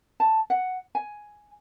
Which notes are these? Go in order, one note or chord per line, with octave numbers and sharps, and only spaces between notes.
A5
F#5
G#5